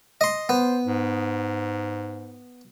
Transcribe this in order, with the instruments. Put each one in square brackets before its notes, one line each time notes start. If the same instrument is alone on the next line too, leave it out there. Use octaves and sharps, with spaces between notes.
[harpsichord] D#5 C6
[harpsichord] B3 [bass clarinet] C5
[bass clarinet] G#2